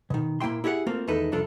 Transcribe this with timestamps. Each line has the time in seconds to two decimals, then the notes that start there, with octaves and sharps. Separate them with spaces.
0.10 B2 D#3
0.40 A#2 A#3 E4 G5 C6
0.64 E4 G4 G#4 D5 F#5
0.86 A3 A#3 C4 F4 F#4
1.08 E2 D#3 G#3 D#4 A4 B4
1.32 C2 F2 D4 F4 A4